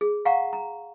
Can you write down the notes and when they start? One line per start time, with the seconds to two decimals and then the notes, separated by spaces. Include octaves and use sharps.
0.01 G#4
0.25 F5 F#5 A#5 C#6
0.53 A#5